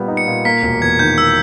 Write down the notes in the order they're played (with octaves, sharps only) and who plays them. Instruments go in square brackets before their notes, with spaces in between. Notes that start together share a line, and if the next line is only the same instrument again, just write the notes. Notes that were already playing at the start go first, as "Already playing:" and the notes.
Already playing: [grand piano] A#2 G3 B3
D#4
[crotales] C#7
[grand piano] A#2
[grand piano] A#3 [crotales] B6
[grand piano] E1
[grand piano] E2 [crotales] G#6
[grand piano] D#3 [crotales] G6
[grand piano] A#3 [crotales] E6